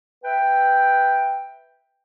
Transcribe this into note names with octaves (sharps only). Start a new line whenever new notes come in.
B4 E5 G5